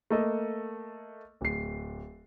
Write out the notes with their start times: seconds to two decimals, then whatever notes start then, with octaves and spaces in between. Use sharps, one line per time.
0.11 A3 A#3 A4 D#5
1.41 D1 C7